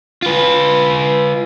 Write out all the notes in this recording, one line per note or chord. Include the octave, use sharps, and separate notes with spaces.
F4 B4